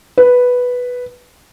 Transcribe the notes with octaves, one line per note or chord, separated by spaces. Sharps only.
B4